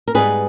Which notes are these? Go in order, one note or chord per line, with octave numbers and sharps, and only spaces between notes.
A#4
G#2 G3 B3 G#4 B4